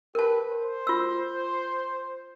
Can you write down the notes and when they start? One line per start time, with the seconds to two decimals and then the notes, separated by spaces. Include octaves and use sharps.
0.15 G4 A#4 B4 A5
0.52 C5
0.87 F4 E6